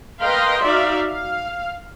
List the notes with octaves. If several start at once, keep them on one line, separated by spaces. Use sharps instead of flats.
A#4 B4 D#5 F5 G5 C6
D#4 F#4 D5 E5 F5
F5